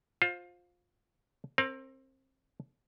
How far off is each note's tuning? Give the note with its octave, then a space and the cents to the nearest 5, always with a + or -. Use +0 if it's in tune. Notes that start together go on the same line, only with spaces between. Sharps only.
F4 +20 C5 +10
C4 +25 A#4 -15